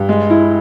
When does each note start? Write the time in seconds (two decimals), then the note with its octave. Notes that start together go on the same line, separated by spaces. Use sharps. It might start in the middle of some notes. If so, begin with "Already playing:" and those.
Already playing: G2
0.09 G#3
0.30 E4